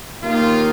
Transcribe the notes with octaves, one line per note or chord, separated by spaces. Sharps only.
D#2 D#3 A#3 D#4 F4